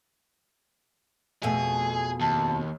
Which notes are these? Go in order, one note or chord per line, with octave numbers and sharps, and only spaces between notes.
F2 B2 A3 G#4
D#2 A5